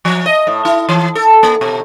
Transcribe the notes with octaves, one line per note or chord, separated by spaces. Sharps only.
F3
D#5
A2
E4
E3
A4
A#3
B2